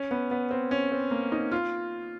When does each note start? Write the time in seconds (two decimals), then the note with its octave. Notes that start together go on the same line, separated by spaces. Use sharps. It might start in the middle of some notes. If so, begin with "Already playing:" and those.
Already playing: C#4
0.11 B3
0.31 B3
0.51 C4
0.71 C#4
0.92 C4
1.11 A#3
1.32 D#4
1.52 F4